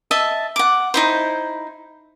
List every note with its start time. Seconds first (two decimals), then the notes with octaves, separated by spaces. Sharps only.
0.11 D#5 E5 A5
0.56 F#5 D6
0.94 D#4 E4 C5